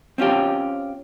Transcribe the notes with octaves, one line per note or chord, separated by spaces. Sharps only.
C4 C#4 F4 G4